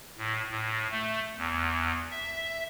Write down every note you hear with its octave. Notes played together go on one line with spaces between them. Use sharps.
A2
A2
A3
E2
E5